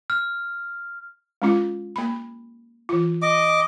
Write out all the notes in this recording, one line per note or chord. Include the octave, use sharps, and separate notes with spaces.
F6
G#3 C#4 F4
A#3 B5
E3 F4
D#5 D6